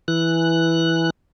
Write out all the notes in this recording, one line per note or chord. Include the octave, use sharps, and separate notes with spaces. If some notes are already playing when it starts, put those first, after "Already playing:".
E3 F#6